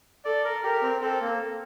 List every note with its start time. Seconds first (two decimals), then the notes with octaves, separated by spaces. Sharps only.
0.25 A4 D5
0.45 A#4
0.63 G4 A#4
0.82 C4
1.01 C4 A4
1.21 A#3